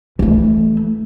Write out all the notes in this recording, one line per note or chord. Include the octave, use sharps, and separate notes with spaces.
E3 A3